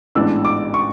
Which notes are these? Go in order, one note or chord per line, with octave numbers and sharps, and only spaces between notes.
A1 G#2 E3 B3 D4 E6
D6
C#6